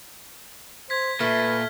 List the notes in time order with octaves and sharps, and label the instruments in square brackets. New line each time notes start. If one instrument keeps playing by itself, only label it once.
[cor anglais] C5 [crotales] G#6 B6
[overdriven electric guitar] A#2 [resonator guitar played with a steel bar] A3 [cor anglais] B4 [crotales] F6